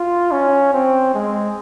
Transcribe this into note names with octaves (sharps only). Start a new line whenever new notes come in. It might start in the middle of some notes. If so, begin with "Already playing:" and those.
Already playing: F4
C#4
C4
G#3